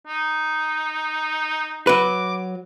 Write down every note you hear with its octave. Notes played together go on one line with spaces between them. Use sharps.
D#4
F#3 B4 D6